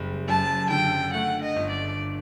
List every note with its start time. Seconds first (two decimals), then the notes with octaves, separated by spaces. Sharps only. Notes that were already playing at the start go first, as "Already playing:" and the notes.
Already playing: F#1 G3
0.28 F#2 A5
0.71 D3 G5
1.14 A3 F#5
1.42 D#5
1.56 G1
1.71 D5